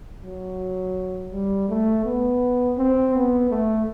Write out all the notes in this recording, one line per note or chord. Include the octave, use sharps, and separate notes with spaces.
F#3
G3
A3
B3
C4
B3
A3